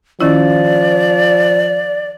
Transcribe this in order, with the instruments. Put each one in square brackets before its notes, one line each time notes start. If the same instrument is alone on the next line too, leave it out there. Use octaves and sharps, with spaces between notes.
[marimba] D#3 C#4 E4 [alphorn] F3 [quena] D5